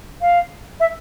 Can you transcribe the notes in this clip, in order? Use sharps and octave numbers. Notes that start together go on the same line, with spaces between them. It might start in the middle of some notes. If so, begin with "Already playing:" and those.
F5
E5